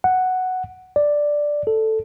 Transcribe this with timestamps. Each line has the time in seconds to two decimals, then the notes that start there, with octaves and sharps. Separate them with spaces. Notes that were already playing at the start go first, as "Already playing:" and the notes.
0.04 F#5
0.96 D5
1.67 A4